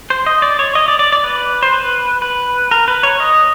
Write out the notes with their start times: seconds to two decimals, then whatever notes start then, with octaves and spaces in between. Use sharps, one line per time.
0.10 C5
0.26 D#5
0.42 D5
0.59 C#5
0.75 D#5
0.88 D5
0.99 D5
1.12 D5
1.24 B4
1.63 C5
1.73 B4
2.22 B4
2.71 A#4
2.88 B4
3.03 C#5
3.20 D#5